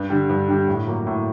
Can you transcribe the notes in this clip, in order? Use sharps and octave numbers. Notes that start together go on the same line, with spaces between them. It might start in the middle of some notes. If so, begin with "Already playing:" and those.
Already playing: G2
D3 G3
G2
D3 G3
A2
F#3 A#3
A2